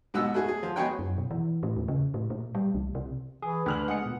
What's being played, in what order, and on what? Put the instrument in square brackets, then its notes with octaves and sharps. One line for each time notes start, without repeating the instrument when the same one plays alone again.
[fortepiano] G#2 B2 B3 F#5 E6
A3 F#4 G#4
G#4
F3
G#3 B3 F#4 G#4 C#5 G5
[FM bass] F#2
B2
E3
A2
E2
C#3
A2
A#2
G3
C2
C3
[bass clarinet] E3 [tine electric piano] G#4
[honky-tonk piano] D2 F6 F#7 [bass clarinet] D4 [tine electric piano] B4
[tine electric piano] G#3 G#4 C#7 [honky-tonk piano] F#5
[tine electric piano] A#2 B3